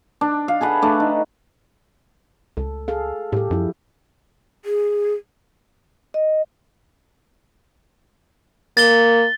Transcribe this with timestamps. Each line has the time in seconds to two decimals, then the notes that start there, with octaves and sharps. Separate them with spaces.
0.21 D4
0.48 F5
0.61 G#4 A4 B4 F#5
0.82 A3 D4
1.00 D#4
2.57 C#2 A4
2.88 G#4 A4 F5
3.32 A2 G4 A4
3.51 F#2 F3 E4
4.65 G#4
6.14 D#5
8.77 A#3 A6 G7